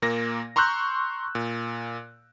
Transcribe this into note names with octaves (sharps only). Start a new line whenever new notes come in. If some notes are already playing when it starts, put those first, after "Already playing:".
A#2 A#3 A#6
A#5 C6 C#6 E6 F#6 G6
A#2